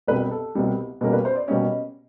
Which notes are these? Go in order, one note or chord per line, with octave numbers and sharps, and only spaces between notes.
C2 B2 G3 C4 B4
A4
C2 B2 G3 C4
B2 G3 A#3 C#4 A#4
B4
C5
D5
B2 G3 A#3 C#4 D#5